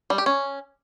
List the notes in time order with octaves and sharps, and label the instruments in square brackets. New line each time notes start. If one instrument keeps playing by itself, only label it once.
[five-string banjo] G3
G4
C#4